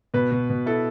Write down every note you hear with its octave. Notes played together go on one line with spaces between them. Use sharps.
B2 B4
B2
B2
E4 A4